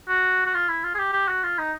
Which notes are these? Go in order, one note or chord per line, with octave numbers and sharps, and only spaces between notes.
F#4
F#4
F4
E4
F4
G#4
G4
G4
F#4
F4
D#4